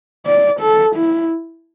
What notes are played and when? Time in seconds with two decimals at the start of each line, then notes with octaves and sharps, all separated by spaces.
0.26 D5
0.61 A4
0.96 E4